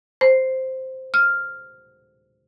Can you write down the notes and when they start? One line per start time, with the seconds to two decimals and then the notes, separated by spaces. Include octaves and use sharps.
0.21 C5
1.14 F6